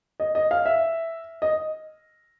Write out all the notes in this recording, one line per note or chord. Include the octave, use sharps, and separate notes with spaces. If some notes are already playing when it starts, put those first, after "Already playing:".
D#5
D#5
F5
E5
D#5